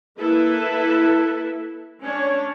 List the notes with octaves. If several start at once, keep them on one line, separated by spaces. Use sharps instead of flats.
A#3 E4 A4 B4 E5
C#4 D4 C#5